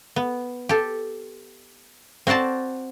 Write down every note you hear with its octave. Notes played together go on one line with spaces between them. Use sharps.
B3
G4 A4
C4 F#4 C5 D5 A5